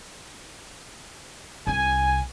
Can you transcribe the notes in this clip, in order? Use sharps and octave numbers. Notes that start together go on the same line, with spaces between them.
C2 C3 G#5